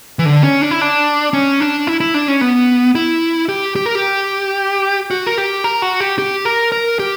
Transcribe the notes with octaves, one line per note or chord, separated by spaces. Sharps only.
E3
D3
C#4
D4
E4
D4
C#4
D4
E4
E4
D4
C#4
B3
E4
G4
G4
A#4
G4
F#4
A#4
G4
A#4
F#4
G4
G4
A#4
A#4
G4